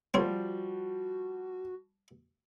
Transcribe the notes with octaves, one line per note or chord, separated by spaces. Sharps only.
F3 G3 C4 F#4 C#5